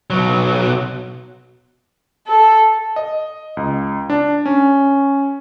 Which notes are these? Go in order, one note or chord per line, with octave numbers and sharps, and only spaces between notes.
B1 F#3
A4
D#5
C#2
D4
C#4